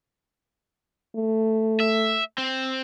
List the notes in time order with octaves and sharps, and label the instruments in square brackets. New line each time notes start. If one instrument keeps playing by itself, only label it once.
[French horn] A3
[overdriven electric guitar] E5
C4